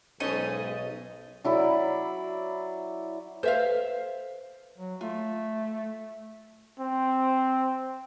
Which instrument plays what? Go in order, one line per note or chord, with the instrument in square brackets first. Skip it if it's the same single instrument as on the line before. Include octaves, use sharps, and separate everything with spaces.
[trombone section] B1 [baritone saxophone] G#2 [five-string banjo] C#4 G#4 A4 [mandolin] D#5
[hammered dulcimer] F#3 E4 D5 B5
[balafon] A4 B4 [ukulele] C5 E5 F5
[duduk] F#3
[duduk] A3 [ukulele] F4
[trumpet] C4